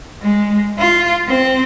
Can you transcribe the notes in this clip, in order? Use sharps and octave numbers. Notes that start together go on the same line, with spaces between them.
G#3
F4
C4